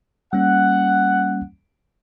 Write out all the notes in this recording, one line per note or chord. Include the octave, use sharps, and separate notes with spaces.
G3 A#3 C#4 F#5